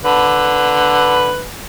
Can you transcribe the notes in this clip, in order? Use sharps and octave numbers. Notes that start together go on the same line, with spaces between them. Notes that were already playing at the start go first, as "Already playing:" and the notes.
D3 B4